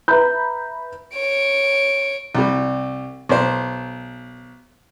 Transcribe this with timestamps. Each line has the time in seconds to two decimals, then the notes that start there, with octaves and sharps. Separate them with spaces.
0.08 B4 E5 A#5 B5 G6
1.14 C#5 D7
2.35 C2 G3
3.29 B1 C5